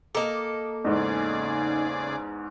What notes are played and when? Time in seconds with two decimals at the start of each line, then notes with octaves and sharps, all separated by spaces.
0.15 A#3 A4 D#5 A#5 D6
0.84 E2 G#2 C#3 D#4 G#4 D5 D#5